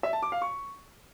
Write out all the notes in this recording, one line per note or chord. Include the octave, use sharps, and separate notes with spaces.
E5
A5
D6
F5
C#6